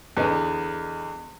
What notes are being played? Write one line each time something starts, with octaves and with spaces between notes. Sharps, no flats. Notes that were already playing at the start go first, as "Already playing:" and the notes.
E2 D3 B3 D#4